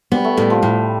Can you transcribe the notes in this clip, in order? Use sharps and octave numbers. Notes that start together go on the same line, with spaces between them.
G3 B3
A3
A2 G3
F3
A2 G3